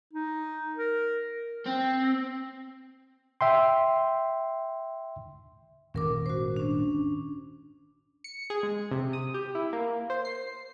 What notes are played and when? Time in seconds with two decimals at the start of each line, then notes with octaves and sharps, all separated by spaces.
0.13 D#4
0.76 A#4
1.66 C4
3.41 E5 G5 C6
5.94 D#1 G#1 C#4 A#4 D6
6.26 F#4 C5
6.56 C#4 D4
8.24 C#7
8.50 G#4
8.63 G#3
8.91 C3
9.13 D#6
9.34 G4
9.55 E4
9.73 A#3
10.10 C5
10.25 C7